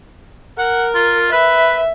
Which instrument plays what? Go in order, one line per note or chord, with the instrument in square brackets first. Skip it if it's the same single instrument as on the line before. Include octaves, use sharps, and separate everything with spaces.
[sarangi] A#4 [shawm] F#5
[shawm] F4
[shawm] B4 [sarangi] E5